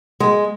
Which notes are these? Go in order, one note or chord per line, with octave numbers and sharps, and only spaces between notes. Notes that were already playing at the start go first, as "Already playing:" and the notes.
G#3